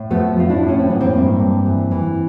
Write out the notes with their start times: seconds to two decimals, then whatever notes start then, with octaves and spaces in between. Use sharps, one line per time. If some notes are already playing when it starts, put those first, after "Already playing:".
Already playing: A2
0.10 F3 A3 B3
0.36 F3 F4
0.49 D4 E4
0.62 A2
0.68 C#4
0.79 C4
0.88 E3 B3
1.00 A#3 C4
1.14 G2
1.39 G2
1.66 E3
1.91 E3